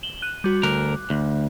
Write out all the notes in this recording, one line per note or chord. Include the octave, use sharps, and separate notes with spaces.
E7 F#7 G7
F#6 D#7
G3 F#4
D2 A#4 D6 F#6
D2